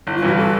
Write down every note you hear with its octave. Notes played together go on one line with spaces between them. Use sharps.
G1 E4
F4
G2 E3 F#4
A4